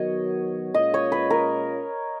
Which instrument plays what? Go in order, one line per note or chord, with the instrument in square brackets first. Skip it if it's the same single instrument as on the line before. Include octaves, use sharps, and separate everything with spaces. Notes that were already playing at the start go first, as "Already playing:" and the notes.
Already playing: [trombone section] D#3 F#3 B3 F#4 A#4 [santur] C#5 D#5
[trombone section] A#2 G#3 C#4 F4 [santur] D#5
[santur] C#5
B4
A#4